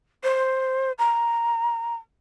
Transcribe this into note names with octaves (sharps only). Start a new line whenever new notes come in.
C5
A#5